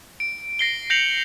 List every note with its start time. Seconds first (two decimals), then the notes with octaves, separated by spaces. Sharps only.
0.20 D7
0.59 A#6 C7 G7
0.90 G6 A#6 C7 C#7 F7 F#7